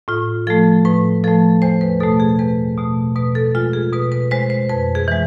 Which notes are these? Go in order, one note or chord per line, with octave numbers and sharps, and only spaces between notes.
A2 F4
F3 A3 A4
A2 B4
F3 A3 A4
E2 C5
B4
B2 A3 A4
G#4
E2 B4
B2 A3
B2 B4
A4
G#3 F4
G#4
B2 B4
B4
G#3 C5
C5
F2 B4
G#4
E3 G#3